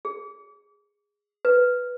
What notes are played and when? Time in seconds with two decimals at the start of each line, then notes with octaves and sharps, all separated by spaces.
0.05 G#4
1.45 B4